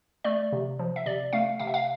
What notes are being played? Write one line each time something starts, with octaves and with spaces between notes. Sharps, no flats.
A3 D5
C3
F3
E5
C3 D5
A3 F5
C3 F5
E5
F5